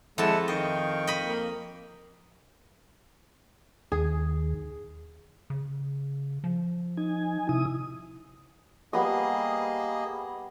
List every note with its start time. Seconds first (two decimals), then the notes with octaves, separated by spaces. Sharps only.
0.18 F2 G#3 E4 A4 F#5 A5
0.48 D#3 D#5 F5 G5 C#6
1.07 D#5 B5
1.23 A#3
3.92 D#2 G#4
5.50 C#3
6.44 F3
6.97 D#4 G#5
7.49 C3 E4 D#6
8.93 G3 A#3 B3 G#4 D#5 D#6